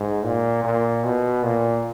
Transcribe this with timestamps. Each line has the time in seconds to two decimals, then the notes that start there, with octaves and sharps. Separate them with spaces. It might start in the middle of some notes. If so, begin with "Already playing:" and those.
Already playing: G#2
0.24 A#2
0.64 A#2
1.04 B2
1.43 A#2